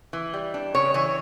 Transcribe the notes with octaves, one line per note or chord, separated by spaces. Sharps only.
E3
G3
D4
C#3 C#5
E3 C#5